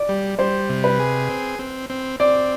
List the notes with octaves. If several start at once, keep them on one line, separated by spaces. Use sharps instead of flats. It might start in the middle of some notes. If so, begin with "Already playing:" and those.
Already playing: D5
G3
G3 C5
C3
B4
G#4
C4
C4
C4
C4 D5